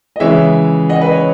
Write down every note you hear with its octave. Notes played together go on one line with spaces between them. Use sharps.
D#5
C#3 E3 G#3 C#5 E5
D#5 F#5
B4 D#5
C#5